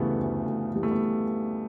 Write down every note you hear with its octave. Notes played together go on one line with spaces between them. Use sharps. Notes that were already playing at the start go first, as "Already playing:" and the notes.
Already playing: D2 C#3 E3 G3 A3 B3
D2
D2
E3 G3
A3
B3